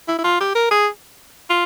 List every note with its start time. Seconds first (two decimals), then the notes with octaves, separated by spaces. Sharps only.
0.08 E4
0.18 E4
0.24 F4
0.40 G4
0.55 A#4
0.71 G#4
1.50 F4